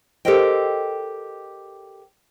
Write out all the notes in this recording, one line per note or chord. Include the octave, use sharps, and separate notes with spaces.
G4 A4 A#4 C5 D#5 G5